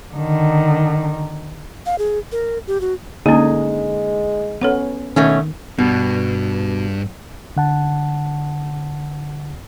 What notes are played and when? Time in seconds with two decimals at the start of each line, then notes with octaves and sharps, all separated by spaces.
0.14 D3 D#3
1.86 F5
1.98 G#4
2.32 A#4
2.67 G4
2.81 F#4
3.26 D3 G#3 A#3 C#4 D#4 G#4
4.61 B3 C#4 A4 C#5 F#5
5.16 B2 D#3 A3 C#4
5.78 G2 B2
7.57 D3 F#5 A5